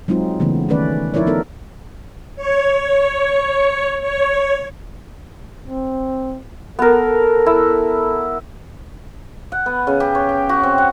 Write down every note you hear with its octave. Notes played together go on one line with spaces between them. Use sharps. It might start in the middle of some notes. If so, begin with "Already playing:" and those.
F#3 G#3 C4 D#4 F4
C#3 E3 A3 B3
D#3 A3 C#4 B4 D5
F3 D#4 E4 A#4 C#5 D5
B3 D#4 A4 A#4
C#5
C#5
C4
B3 A4 A#4
E4
F#5
B3
C#3
G4
C#5
G5
F#4
C4
F#5